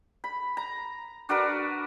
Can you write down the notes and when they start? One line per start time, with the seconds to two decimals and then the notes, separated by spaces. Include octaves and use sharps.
0.24 B5
0.57 A#5
1.29 D4 F#4 A#4 B4